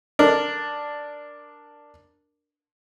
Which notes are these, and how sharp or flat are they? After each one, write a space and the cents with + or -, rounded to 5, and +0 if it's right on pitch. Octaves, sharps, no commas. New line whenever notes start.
D4 +0 A#4 +0